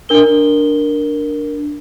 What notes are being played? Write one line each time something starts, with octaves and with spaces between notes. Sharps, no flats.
D4 A#4 G7